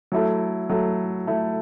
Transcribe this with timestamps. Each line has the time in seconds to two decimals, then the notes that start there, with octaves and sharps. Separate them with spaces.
0.12 F#3 A3 E4 A4
0.69 F#3 A3 E4 A4
1.27 F#3 A3 E4 A4